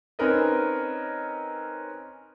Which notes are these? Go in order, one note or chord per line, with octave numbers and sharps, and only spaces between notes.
C4 C#4 D#4 A#4 B4 D#5